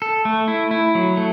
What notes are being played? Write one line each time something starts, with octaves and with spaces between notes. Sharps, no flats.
A4
A3
E4
E4
F#3
A3